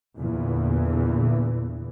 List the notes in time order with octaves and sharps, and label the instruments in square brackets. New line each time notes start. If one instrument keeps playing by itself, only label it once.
[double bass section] E2 A#2 D3 E3